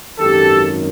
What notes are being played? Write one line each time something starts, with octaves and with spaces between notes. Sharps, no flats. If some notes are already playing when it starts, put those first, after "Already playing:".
G#1 F#2 D#3 G4 A4